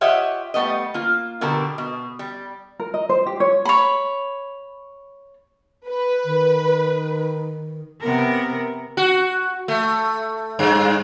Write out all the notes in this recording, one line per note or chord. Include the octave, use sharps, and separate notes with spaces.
F4 G4 C#5 D#5 E5 F#5
G3 A3 B3 D#5
A#3 F4
B2 D3 G3 A#4 A5
B2
G3
A#4
D#5
C5
G4
C#5
C#5 B5
B4
D#3
C3 B3 A#4
F#4
A3
G2